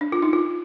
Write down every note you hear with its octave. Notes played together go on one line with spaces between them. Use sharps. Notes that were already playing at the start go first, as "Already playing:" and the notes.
D4
F4
D#4
F4